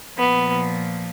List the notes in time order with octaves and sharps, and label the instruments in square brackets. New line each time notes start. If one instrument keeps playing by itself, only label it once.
[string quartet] A#2 F3 B3